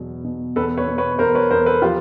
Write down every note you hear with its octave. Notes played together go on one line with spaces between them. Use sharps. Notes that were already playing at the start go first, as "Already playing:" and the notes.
Already playing: E2 B2 F#3
B2
E2 A4 B4
B4 C#5
B2
B4 C#5
E2 A#4 C5
B4 C#5
E2 A#4 C5
A4 B4
F3 F4 G4